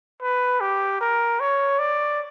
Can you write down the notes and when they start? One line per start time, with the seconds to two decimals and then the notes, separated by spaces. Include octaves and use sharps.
0.21 B4
0.60 G4
1.01 A#4
1.40 C#5
1.79 D5